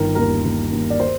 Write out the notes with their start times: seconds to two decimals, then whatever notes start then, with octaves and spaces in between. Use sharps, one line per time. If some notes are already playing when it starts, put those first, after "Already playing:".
Already playing: G1 D#3 A#4
0.15 D#2 A#4
0.44 D#2
0.72 D#2
0.90 D5
1.00 C5